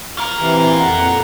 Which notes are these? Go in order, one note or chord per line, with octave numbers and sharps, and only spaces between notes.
F4 A#4
C3 E3
F2 F#5 A#5